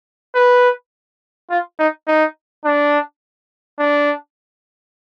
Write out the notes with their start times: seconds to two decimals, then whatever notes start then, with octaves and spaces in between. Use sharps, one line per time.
0.35 B4
1.50 F4
1.79 D#4
2.07 D#4
2.65 D4
3.79 D4